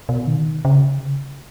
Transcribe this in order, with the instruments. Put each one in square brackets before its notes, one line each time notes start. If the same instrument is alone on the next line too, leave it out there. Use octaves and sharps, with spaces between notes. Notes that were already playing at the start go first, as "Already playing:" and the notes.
[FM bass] B2
D#3
C#3